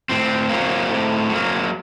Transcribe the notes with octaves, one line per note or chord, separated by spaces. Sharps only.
A2 C4
F#3 A#3
A2
F#3 A#3